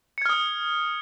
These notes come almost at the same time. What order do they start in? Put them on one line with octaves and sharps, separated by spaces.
C#7 G#6 F6 D#6